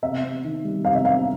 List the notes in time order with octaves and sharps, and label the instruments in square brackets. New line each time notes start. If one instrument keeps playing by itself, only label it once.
[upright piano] C3 E5
C4
D#3
G3
C3 F5
E5
C4 F5